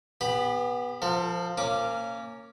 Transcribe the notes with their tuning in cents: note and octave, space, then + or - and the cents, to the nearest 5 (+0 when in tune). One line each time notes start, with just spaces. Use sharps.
B3 -10 G4 +35 B5 +0
F3 +0 A4 +45
A#3 -25 C#4 +0 D6 +0